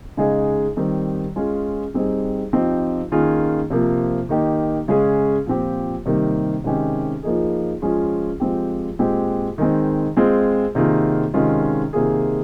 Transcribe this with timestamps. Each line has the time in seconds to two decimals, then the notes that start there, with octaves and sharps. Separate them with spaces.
0.17 C#3 G#3 D#4 G#4
0.76 D#3 G3 C4 D#4
1.36 G#3 C#4 F4 G#4
1.94 G3 C4 D#4 G#4
2.53 F3 C4 D#4 G4
3.12 D#3 A#3 C#4 F4 G#4
3.70 C3 F3 A#3
4.29 D#3 A#3 D#4 G4
4.88 C#3 G#3 C#4 G#4
5.47 A#2 F3 C4 G4
6.06 C3 D#3 G3 A#3
6.64 C3 D#3 G#3 C#4 G4
7.23 F3 A#3 D#4 G#4
7.82 F3 G#3 C#4 F4 G#4
8.40 F3 G#3 C4 G4
8.99 A#2 G#3 C4 G4
9.58 D#3 G#3 C4
10.17 G#3 C4 F4 G#4
10.75 C3 D#3 A#3 F4 G#4
11.34 C3 D#3 G#3 C#4 F4
11.93 C3 D#3 A#3 F4 G#4